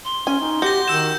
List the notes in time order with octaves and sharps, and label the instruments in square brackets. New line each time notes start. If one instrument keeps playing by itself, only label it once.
[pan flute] C6
[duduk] C#4 [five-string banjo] G#5
[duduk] D#4
[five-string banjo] F#4 [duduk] G4 [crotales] G6 A#6
[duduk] D#3 [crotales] E6 G6 E7